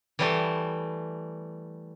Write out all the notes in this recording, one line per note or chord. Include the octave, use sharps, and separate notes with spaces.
E3 G3 A3